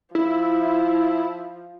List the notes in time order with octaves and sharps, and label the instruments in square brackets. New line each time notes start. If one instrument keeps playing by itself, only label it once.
[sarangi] F3 [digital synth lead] E4